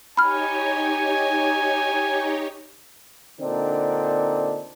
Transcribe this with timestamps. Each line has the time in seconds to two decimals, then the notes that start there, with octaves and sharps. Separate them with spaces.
0.17 D#4 G4 C#5 G#5 B5 F6
3.41 A#2 D3 C4 D4 D#4